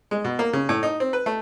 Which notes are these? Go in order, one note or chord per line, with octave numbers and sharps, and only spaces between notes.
G#3
B2
A#3
C#3
A2
D#4
C4
B4
A3